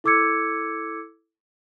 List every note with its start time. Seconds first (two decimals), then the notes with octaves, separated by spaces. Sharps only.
0.04 E4 A4 D6 E6 G#6 C#7